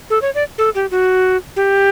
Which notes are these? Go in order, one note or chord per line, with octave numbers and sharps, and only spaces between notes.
A4
C#5
D5
A4
G4
F#4
G4